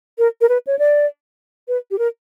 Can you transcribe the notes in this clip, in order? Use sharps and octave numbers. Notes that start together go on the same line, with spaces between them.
A#4
A#4
B4
C#5
D5
B4
G4
A#4